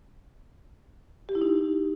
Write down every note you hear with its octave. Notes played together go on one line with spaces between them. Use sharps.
G4
E4
D#4